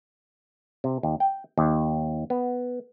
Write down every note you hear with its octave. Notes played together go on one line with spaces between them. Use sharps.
C3
D#2
G5
D#2
B3